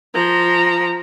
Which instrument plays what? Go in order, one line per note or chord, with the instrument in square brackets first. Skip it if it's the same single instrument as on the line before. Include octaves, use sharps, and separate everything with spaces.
[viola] F3 A#5